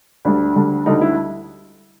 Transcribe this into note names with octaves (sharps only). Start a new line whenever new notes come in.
D2 D3 G3 D4
D2 D3 G3
D2 D3 G3 D#4
E4